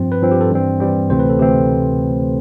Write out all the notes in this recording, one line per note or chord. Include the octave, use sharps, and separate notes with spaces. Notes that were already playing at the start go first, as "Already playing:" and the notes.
Already playing: G2 F3 C4
B4
G2 F3 C4
G4
A4
G2 E3 G3 C4
G2 E3 G3 C4
D2 C3 E3 A3 C4 C5
B4
A4
D2 C3 E3 A3 C4 G4